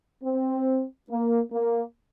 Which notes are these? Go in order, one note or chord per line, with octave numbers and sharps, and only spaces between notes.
C4
A#3
A#3